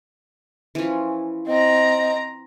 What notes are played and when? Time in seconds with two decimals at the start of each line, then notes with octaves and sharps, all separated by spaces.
0.75 E3 F3 C#4
1.47 C4 D#5 A#5